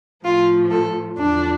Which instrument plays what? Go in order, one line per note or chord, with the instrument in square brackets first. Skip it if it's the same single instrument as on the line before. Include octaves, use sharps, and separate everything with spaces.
[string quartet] A2 F3 F4
A4
E2 D3 F3 D4